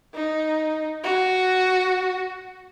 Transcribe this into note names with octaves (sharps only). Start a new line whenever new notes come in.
D#4
F#4